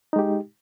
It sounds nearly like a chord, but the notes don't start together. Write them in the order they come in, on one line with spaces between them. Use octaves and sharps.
D#4 G#3 G4